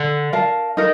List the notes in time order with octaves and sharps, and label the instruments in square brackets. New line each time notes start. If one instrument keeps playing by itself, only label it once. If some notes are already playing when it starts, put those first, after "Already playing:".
Already playing: [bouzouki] D3
[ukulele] A#4 F5 A5
D#4 A#4